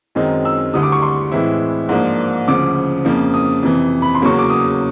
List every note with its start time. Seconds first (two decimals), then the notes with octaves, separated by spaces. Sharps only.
0.15 F#2 D#3 G#3 C4 D#4
0.45 E6
0.74 D2 D3 G3 D#6
0.83 D6
0.92 C#6
1.02 C6
1.31 A2 E3 G#3 C4 E4
1.89 G#2 F3 A#3 D4
2.48 D2 C#3 F3 D6
3.05 F2 C#3 F3 A#3
3.34 D#6
3.63 F2 C3 E3
4.02 B5
4.15 C6
4.22 E2 C#3 F#3 A#3 C#4 C#6
4.38 D6
4.50 D#6